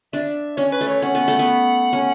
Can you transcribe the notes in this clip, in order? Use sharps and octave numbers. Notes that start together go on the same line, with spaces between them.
D4 E5
C#4 C#5
B4
A3
C#5
C#4 F#5
B3
A3
B3
C#4